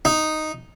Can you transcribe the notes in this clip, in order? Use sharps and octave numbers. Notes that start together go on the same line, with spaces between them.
D#4